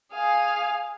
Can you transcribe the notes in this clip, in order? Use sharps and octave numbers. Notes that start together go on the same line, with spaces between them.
G#4 F5